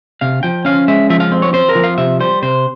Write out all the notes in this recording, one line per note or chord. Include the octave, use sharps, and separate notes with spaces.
C3 F5
F3 G5
C#4 F5
G#3 E5
F3 E5
F5
C4
C#5
C4 C5
A#4
F3
F5
C3 E5
G3 C5
C3 C5